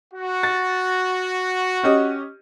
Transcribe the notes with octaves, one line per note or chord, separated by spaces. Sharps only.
F#4
A6
C#4 G4 D#5